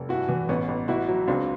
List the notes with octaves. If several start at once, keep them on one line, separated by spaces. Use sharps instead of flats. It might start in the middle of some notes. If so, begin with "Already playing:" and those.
Already playing: F1
G2 E4 F#4
E3
A1 B3 C#4
A1
A1 E4 F#4
F#3
C#2 C4 D4